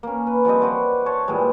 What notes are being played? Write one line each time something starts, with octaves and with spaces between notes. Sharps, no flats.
A#3 C#4
B4
F3 G3 C4 D#5
F#4 B4 C5 D5
C5 C#5 A5 C#6
A#2 E3 G3 G#3